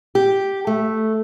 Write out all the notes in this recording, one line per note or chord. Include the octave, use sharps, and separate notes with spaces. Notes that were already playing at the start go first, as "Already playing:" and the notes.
G4
A3